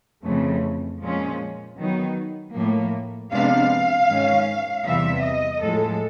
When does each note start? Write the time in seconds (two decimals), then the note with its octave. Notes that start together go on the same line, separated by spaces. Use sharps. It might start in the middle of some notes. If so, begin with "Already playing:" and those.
0.25 F2 C#3 E3 A3
1.02 A#2 F3 G#3 C#4
1.78 D#3 F#3 B3 D#4
2.55 A2 F3 A#3
3.32 C3 F3 G#3 B3 D4 F5
4.08 G#2 D#3 G#3 C#4
4.85 E2 C3 E3 G3 E5
5.23 D#5
5.62 A2 F3 G#3 A4